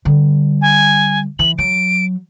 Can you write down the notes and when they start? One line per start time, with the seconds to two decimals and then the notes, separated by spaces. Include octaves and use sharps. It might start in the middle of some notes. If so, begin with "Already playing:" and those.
0.05 D3 G3
0.62 G#5
1.39 E3 F#7
1.58 F#3 D7